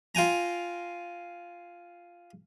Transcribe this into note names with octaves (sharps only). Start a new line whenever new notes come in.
F4 G5 G#5 A#5